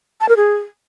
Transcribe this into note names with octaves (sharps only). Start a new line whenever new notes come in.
A5
A#4
G#4